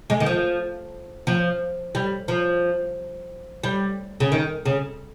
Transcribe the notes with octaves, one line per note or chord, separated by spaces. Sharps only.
G#3
D#3
F3
F3
G3
F3
G3
C#3
D#3
C#3